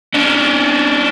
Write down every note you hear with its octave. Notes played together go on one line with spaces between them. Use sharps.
C#4 D4